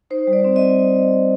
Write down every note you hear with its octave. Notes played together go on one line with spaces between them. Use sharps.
D#4 C5
G3
D5
C4
D#5